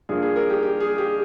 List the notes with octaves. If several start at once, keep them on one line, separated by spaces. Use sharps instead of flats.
G2 F3 A#3 G#4
G#4
A#4
G4
G4
G#4
G4